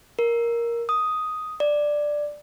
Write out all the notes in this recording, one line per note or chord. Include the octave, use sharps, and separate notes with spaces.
A#4
D#6
D5